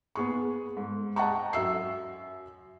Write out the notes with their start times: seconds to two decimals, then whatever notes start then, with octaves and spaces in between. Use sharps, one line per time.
0.15 B3 G#4 C#6
0.77 G#2
1.16 D#5 F#5 G5 A5 A#5 C#6
1.53 F#2 E5 E6 C7